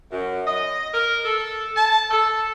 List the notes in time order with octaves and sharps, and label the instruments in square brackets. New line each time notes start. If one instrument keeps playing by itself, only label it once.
[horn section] F#2
D#5
A#4
A4
A5
A4